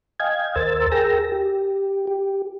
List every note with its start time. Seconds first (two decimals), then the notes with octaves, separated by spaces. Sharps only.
0.20 D#5 F5 G5 G#5 G#6
0.56 D#2 A#4 C5 E6 A6
0.92 G#4 A#4 G5 E6 A#6
1.32 G4
2.07 G4